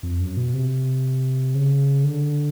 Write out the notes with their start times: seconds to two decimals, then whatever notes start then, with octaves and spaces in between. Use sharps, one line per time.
0.03 F2
0.20 F#2
0.37 B2
0.54 C3
1.55 C#3
2.04 D3